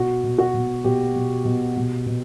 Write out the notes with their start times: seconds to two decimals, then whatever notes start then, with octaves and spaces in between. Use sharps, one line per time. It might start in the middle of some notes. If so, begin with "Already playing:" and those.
Already playing: B2 F#4
0.23 B2
0.38 F#4
0.54 B2
0.84 B2 G4
1.15 B2
1.45 B2
1.76 B2
2.06 B2